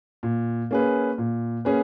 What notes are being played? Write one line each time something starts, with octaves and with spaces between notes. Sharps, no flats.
A#2
A#3 C#4 G#4 B4
A#2
A#3 C#4 G#4 B4